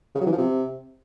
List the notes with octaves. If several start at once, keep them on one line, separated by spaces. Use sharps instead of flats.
C#3
F#3
E3
F3
C3